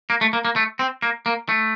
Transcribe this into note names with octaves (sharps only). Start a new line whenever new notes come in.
A#3
A3
A#3
A#3
A3
C4
A#3
A#3
A3